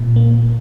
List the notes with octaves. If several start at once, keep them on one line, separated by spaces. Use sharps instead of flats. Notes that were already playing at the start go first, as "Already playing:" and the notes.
Already playing: A#2
A#3